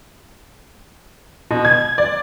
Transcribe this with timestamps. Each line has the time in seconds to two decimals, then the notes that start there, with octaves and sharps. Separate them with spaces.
1.51 B2
1.65 G#6
1.98 D5